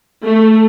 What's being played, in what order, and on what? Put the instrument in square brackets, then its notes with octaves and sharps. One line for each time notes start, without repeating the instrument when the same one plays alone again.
[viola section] A3